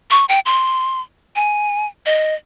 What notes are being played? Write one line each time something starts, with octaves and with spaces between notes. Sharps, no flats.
C#6
G5
C6
G#5
D#5